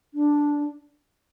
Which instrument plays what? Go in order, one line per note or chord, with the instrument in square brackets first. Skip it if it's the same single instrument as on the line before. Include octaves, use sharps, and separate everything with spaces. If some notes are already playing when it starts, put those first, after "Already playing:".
[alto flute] D4